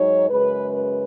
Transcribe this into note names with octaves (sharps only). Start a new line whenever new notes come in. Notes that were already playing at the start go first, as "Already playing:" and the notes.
Already playing: G#2 F#3 D#4 C#5
F#2 C#3 G#3 B4
B4